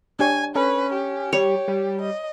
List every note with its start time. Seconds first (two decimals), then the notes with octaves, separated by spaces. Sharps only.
0.19 D4 G4 C#5 G#5
0.55 C#4 A4 B4
0.93 G4
1.33 G3 C#5
1.68 G3
2.01 D#5